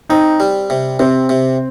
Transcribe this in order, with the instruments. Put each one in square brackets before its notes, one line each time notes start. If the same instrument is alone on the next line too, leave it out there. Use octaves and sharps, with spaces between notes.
[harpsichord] C4 [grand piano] D#4
[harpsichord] G3
C3
[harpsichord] C3 [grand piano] C4
[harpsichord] C3